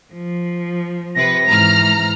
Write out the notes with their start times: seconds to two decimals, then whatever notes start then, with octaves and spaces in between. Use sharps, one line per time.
0.14 F3
1.15 C3 B4 A#6
1.47 G#2 E3 A#5 F6